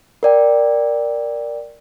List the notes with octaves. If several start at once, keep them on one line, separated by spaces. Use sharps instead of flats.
A#4 D5 G5